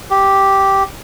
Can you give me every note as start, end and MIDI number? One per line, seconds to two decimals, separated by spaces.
0.10 0.83 67